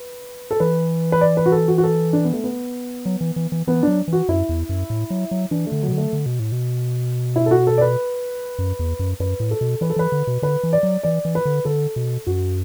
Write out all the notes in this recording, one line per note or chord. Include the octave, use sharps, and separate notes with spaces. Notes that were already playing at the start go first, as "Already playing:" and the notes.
Already playing: B4
A4
E3 B4
B4
D5
B4
F#4
A4
F#4
F#4
A4
D4
B3
A3
B3
F#3
E3
E3
E3
E3 B3
F#3 D4
E3 F#4
F#2 E4
E2
F#2
A2
F#3
F#3
E3 D4
A3
D3
F#3
B2
D3 A3
D3
B2
A2
B2
E4
A4
F#4
A4
D5
B4
F#2
E2
F#2
F#2 B4
A2
A4
B2
E3 B4
A4
E3 B4
D3
B2
D3 B4
E3
D5
F#3
E3 D5
E3
B4
D3
D3 A4
B2
F#2 F#4